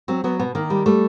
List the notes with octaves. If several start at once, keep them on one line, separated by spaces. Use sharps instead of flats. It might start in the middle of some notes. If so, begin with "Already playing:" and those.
F#3 C4
F#3 B3
B2 B3
D#3 A#3
G3
G3 A3